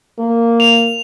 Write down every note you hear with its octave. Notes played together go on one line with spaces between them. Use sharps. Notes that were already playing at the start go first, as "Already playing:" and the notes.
A#3
F7